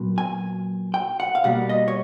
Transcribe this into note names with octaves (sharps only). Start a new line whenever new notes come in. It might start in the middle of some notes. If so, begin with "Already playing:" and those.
Already playing: A#2 F#3 B3
G#5
G5
F#5
F5
B2 G3 A#3 F#5
D#5
C#5